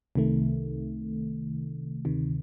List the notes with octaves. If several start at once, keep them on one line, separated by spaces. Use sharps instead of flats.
C2 C3 D#3 A3
D2 C3 D#3